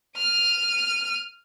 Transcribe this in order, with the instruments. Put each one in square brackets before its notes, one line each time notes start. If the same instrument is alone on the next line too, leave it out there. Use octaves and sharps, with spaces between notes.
[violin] F6 D#7